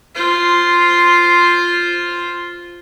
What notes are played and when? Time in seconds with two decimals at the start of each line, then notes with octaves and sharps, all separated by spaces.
0.15 F4 C5